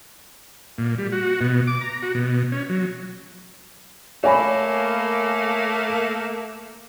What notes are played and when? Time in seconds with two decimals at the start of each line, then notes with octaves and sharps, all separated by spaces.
0.78 A#2
0.98 G3
1.12 F#4
1.41 B2
1.67 D6
1.81 A#5
2.02 F#4
2.14 B2
2.52 C#4
2.69 F#3
4.24 A3 A#3 C#5 G#5 B5